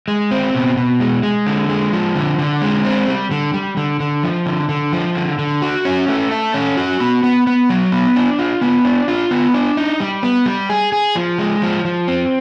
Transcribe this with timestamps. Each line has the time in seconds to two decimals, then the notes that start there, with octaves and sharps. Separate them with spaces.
0.08 G#3
0.31 C4
0.54 B2
0.77 B2
1.00 G#3
1.23 G#3
1.47 D3
1.69 G#3
1.93 F3
2.16 D3
2.39 D3
2.62 G#3
2.84 C4
3.08 G3
3.31 D3
3.54 G3
3.77 D3
4.00 D3
4.23 F3
4.46 D3
4.69 D3
4.93 F3
5.15 D3
5.39 D3
5.62 F#4
5.85 C#4
6.08 A3
6.31 A4
6.54 C#4
6.77 F#4
7.00 B3
7.23 B3
7.47 B3
7.69 F#3
7.92 B3
8.16 D4
8.39 F4
8.61 B3
8.85 D4
9.08 F4
9.31 B3
9.54 D4
9.77 D#4
10.00 G3
10.23 B3
10.46 G3
10.70 G#4
10.92 G#4
11.15 F3
11.39 G#3
11.62 F3
11.85 F3
12.08 C4